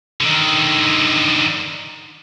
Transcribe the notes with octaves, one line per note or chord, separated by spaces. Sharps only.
D3 D#3